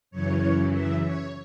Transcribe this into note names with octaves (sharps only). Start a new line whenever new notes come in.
F#2 C#3 E3 C#5
E5
C#5